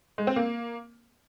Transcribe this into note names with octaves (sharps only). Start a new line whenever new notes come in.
G#3
C4
A#3